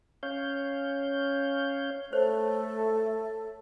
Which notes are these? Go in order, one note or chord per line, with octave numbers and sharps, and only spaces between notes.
C#4 C#5 F5 G6
A3 A4 C5 C#5